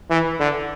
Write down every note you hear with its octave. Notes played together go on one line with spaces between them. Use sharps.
E3
D3